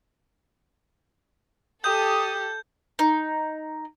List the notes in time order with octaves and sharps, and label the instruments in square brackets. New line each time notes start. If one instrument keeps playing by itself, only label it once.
[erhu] G4 [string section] A4 [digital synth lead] D#6 [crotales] G6
[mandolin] D#4